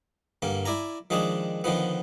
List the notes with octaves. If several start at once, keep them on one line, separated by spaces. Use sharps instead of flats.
G2 D3 A#3
E4 D5 G#5 A#5
D#3 F3 G#3 D4 G#4
D3 D#3 F3 B3